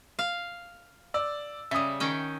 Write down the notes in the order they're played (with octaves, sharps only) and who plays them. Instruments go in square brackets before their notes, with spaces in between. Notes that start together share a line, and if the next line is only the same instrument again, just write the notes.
[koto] F5
[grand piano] D5 E6
[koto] C#3 G3 [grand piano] E5 D#6
[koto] D#3 C#4 G5